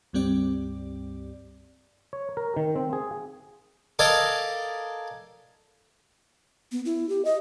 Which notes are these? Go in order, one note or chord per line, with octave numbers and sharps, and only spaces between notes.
C#2 G2 G3 C4 G4 D5
C#5
A#4
D#3
C4
G#4
A4 A#4 D5 D#5 F5 G#5
B3
E4
G4
D#5